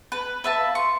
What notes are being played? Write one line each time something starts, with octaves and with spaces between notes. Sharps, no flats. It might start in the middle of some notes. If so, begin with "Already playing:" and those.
B4
B4 E5 A5
F5
C6 C#6